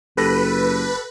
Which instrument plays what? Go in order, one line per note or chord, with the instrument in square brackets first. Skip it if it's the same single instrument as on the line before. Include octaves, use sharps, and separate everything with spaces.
[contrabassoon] F#1 [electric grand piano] G4 A4 A#6 [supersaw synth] B4